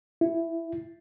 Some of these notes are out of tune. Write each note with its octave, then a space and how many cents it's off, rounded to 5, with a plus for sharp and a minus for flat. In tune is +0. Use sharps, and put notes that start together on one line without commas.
E4 +10